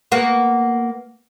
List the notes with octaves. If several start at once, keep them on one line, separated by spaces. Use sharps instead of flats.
A#3 B3 F#4